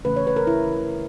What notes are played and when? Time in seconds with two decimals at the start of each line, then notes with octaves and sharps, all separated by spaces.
0.05 C#3 E3 A3 C#4 B4
0.16 C#5
0.27 B4
0.36 A#4
0.47 E4